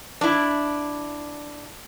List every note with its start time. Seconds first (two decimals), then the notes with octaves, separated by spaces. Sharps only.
0.21 D4 E4